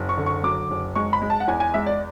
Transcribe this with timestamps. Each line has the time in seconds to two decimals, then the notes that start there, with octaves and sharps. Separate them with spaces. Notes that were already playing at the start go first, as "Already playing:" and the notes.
Already playing: F#1
0.09 C#6
0.18 D3
0.26 C#6
0.43 F#3 D6
0.70 F#1
0.95 G#3 C#6
1.13 B5
1.22 G#3
1.30 A5
1.40 F#5
1.48 E2 G#5
1.60 G#5
1.74 G#3 E5
1.86 D5